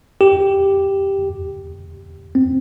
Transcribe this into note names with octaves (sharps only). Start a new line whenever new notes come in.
G4
C4